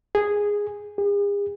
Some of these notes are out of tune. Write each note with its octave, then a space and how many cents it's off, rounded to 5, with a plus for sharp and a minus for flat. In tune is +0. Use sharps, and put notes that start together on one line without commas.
G#4 -10
G#4 -45